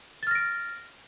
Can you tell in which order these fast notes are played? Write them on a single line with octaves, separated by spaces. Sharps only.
A6 F6 A#6 D7